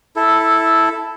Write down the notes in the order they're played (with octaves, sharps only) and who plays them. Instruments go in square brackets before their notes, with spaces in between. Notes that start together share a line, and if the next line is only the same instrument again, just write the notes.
[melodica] E4 A4